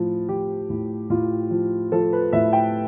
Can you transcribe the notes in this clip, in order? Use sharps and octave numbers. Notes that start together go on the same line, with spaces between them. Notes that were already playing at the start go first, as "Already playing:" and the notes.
Already playing: A2 F3
F3 G4
A2
A2 F4
F3
F3 A4
B4
A2 E5
G5